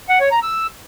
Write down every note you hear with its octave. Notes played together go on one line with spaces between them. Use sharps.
F#5
C#5
A#5
E6